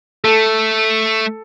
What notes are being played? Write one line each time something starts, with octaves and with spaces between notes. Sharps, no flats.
A3 A4